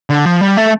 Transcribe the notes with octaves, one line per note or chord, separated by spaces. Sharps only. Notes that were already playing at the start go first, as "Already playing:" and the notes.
D3
F3
G3
A3